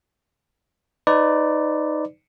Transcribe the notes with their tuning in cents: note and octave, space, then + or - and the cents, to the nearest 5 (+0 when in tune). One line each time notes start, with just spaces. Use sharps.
D#4 +0 B4 +30 D5 +0